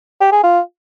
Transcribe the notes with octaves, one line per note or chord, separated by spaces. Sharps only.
G4
G#4
F4